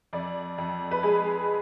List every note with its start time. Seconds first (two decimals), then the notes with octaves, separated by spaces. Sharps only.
0.13 F2 D5
0.58 F2
0.91 B4
1.03 G#3 G#4